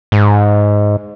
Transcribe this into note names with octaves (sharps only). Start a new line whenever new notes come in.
G#2